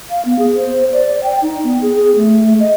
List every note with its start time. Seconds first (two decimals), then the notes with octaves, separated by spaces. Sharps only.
0.10 F5
0.25 B3
0.39 G#4
0.55 C5
0.93 D5
1.23 G5
1.42 D#4
1.64 B3
1.82 G#4
1.96 G#4
2.16 A3
2.60 D#5